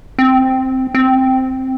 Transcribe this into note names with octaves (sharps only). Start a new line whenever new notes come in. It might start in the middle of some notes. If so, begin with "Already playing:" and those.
C4
C4